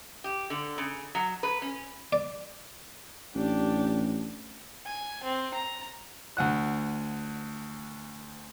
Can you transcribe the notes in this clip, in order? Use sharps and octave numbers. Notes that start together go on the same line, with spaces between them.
G4
D3
C#3
F#3
B4
C#4
D5
A1 D4 G4
G#5
C4
A#5
D2 F#5 F#6